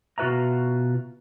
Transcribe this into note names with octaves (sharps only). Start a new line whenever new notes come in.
B2 F4 F#4 B4 E5 A#5